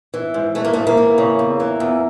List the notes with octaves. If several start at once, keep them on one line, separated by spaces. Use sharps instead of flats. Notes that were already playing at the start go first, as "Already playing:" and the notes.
E3
G#2
E3 A3
A#3
G#2 A3
A#3
E3
C#3
E2
E3
E2